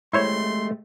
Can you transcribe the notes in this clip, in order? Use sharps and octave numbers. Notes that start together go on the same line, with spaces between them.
G#3 A3 E4 G4 C5 C#5 C6